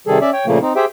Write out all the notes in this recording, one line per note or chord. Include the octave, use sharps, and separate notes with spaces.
C3 D#3 G3 G#4 A4
C#4 D5 E5
C#5 G5
A#2 C#3 F3 A3 A#3
C4 D#4
G4 G#4 C5 E5 G5